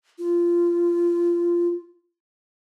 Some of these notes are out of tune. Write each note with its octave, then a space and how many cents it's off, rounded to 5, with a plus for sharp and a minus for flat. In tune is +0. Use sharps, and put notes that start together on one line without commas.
F4 -20